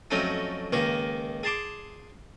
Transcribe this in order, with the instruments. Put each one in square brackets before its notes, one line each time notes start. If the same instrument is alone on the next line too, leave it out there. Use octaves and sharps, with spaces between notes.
[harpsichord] F2 F#3 A3 C#4 D#4
C#2 D#3 A#3 C#6
G#4 A5 C6 D6